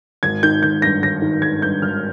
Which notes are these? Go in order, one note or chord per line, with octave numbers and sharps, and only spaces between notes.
G#1 G#6
D#3 G6
G#1 G6
G2 A#6
G#1 A#6
D#3
G#1 G#6
G2 G6
G#1 F6